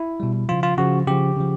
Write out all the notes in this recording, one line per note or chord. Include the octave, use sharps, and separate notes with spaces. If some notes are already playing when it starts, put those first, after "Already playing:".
Already playing: E4
B2 G3
C#3 F3 F4
F4
C#3 F3 F#4
C#3 F3 G4
C#3 F3